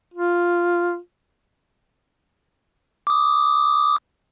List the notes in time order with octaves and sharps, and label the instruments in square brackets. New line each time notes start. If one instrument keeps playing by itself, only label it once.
[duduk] F4
[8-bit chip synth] D6 D#6